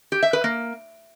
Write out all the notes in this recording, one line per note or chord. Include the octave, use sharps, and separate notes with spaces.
G4
E5
B4
A#3